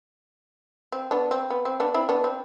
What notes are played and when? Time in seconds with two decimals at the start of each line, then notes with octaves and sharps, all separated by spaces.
0.92 C4
1.11 B3 D4
1.31 C4
1.50 B3
1.65 C4
1.80 B3 D4
1.94 C4 E4
2.09 B3 D4
2.24 C4